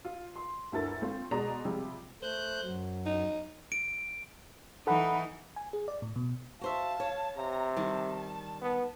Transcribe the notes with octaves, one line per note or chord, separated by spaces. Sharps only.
F4
C6
G1 D2 E4 A4 A#4 A6
A3 C4 F4
B2 G#3 D5 A#5
C3 F3 G3 G#3
A3 C5 F#6 G6
F#2 F#3
D#4
D7
E3 D#4 A4 F#5 B5
G#5
G#4
D5
A2
B2
F#4 C5 E5 F5 A5
C#5
C3 A#5
D#3 G3 A5
B3